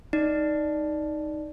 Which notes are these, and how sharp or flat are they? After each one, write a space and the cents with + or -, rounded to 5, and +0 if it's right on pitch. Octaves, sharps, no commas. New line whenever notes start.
D#4 +0 D5 +0